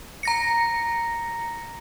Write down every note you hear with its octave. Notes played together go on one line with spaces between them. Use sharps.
A#5 A#6 C#7